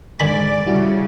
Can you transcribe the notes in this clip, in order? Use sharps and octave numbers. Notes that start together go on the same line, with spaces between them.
G#2 D3 D5 G#5 B5
C#3 G3 E4 F#4